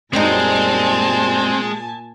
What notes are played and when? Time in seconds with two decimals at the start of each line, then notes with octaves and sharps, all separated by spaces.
0.13 F#2 A#2 G3 G#3 C4 D#4 G#5 A5